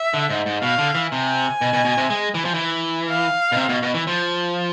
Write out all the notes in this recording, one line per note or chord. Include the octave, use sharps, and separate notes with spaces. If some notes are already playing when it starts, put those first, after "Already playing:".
Already playing: E5
D3
G#2
G#2
B2 F5
D3
E3
C3 G#5
B2
B2
B2
C3
G#3
E3
F3
E3
F5
B2
C3
B2
B2
E3
F3